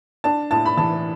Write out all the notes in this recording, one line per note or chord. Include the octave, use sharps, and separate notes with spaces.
D4 A5
A2 A5
B5
E3 A5